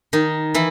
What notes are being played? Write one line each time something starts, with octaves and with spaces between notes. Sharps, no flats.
D#3 D#4
E3 E4